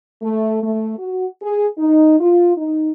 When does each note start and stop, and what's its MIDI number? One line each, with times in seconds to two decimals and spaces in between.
0.22 0.59 57
0.63 0.97 57
0.98 1.27 66
1.42 1.67 68
1.78 2.20 63
2.20 2.52 65
2.57 2.91 63